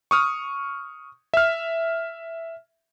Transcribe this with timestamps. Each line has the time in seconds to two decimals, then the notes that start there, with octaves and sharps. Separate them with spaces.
0.11 C#6 D#6 F6
1.34 E5 F6